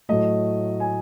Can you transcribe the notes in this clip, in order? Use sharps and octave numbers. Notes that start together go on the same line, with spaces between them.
A2 F#3 A3 D#5
G#5